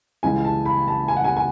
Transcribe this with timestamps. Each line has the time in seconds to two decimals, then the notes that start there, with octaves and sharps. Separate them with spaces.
0.23 C#2 C#3 E3 G#3 G#5
0.45 A5
0.66 B5
0.88 A5
1.08 G#5
1.17 F#5
1.24 G#5
1.37 G#5